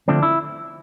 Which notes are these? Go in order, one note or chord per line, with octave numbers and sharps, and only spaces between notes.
D3 F3 A3 C4 D4
E4